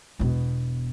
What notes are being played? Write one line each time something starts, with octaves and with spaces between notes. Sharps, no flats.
E1 B2